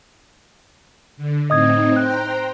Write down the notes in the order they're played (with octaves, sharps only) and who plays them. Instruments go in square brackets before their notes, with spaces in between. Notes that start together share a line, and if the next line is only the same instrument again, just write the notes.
[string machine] D3
[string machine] A2 C4 D#4 [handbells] D#5 D#6 G#6
[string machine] C5 G5 A#5 [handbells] F#6